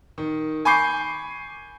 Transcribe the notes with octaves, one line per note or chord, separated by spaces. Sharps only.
D#3
G#5 B5 C#6 D6 G6 C7